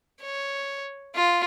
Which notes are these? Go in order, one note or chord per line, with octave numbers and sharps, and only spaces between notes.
C#5
F4